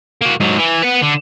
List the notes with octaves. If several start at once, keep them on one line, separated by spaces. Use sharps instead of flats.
A#3 F#4
G#2 F#3
E3
B4 F#5
D3